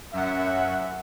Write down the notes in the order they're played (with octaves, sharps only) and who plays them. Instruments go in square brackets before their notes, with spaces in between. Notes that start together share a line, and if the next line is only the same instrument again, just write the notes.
[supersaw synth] F#2 F#5 [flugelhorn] E5